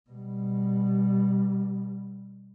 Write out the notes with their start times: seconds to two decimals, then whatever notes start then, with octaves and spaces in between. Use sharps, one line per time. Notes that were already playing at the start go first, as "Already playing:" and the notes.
0.10 B2 G3